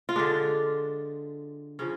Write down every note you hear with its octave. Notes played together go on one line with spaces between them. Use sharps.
F4
D3 G#3 D4
C#3 F3 C#4